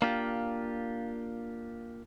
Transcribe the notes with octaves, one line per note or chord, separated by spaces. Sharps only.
A#3 D4 F4 G4